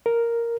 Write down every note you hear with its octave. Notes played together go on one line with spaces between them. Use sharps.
A#4